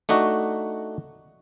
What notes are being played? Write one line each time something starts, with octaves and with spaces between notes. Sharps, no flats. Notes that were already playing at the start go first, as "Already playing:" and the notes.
A3 D4 D#4 F#4